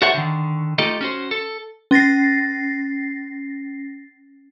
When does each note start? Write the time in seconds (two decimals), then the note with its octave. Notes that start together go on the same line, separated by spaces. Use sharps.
0.02 F#4 A4 C5 C#5 E5 F#5
0.14 D3 D#3
0.78 A3 D#4 F4 G4 A4 D#5
1.01 C#4 F#4 C5
1.31 A4
1.91 C#4 A6 A#6 C7